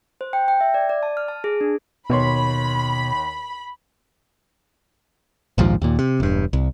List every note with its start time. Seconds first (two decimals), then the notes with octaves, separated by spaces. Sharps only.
0.21 C5
0.33 G5
0.48 G5
0.61 E5
0.74 D5
0.89 D5
1.03 A5
1.17 F6
1.28 A5
1.44 G#4
1.61 D4
2.10 D#2 B2 C#5 B5 C6
5.58 A#1 D#2 G#2 F3
5.82 D#2 A#2
5.99 C3
6.20 E1 G2
6.53 C2